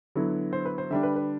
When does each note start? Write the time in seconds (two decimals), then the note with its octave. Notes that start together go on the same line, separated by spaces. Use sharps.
0.16 D3 F#3 B3 E4
0.53 C5
0.66 B4
0.78 C5
0.90 D3 G3 D4 E5
1.03 B4
1.16 B4